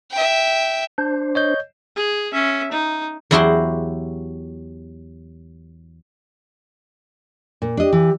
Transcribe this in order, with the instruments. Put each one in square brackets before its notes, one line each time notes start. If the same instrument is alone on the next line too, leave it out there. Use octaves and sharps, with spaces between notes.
[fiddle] E5 G5
[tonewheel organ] D4 C5
[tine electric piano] C#5 D#5 G6
[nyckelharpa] G#4
C#4 E5
D#4
[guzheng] E2 F#3 E4 F#4 G4 C6
[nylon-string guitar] A#2
[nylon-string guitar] D4 D#5 [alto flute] G4
[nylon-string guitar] E3